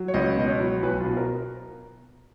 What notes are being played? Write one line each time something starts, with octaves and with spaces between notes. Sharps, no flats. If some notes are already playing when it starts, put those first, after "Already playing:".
Already playing: F#3
C#5
C#2 D#5
B2 D#5
C#5
F#3
B1 B4
F4
B2
A#4